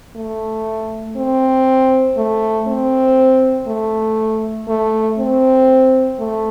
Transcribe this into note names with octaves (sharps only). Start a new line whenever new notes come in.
A3
C4
A3
C4
A3
A3
C4
A3